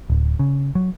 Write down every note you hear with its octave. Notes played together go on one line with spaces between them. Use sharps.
D1
C#3
F#3